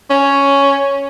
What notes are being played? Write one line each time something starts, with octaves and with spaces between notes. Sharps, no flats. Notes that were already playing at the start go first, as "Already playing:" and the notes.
C#4